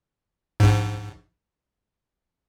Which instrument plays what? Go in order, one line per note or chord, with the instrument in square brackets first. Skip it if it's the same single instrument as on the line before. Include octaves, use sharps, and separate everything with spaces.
[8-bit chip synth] A#1 G#2